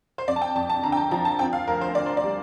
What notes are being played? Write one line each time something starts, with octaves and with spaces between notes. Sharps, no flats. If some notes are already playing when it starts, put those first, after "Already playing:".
C5
F2 D5
A5
G5
F2 A5
A5
D3 A#5
G5
A5
F3 A#5
A5
C4 G5
F5
D2 A#4
C5
D3 D5
C5
D5
G3